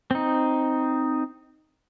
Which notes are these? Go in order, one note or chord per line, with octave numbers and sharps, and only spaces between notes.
C4 D#4